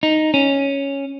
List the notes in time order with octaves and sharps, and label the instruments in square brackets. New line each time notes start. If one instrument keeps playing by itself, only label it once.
[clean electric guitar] D#4
C#4